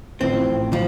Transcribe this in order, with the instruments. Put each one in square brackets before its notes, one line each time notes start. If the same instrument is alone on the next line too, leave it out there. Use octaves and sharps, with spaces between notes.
[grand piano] A1 A2 F3 [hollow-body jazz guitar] C4
[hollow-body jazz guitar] F3